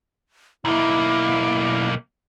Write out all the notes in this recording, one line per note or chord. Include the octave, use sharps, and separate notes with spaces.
B1 A#3 E4